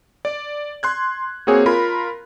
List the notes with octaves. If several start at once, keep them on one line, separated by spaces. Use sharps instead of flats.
D5
C6 F#6 G#6
A#3 C4 F#4 G#4 C#5 G#5
F4 A#4 B5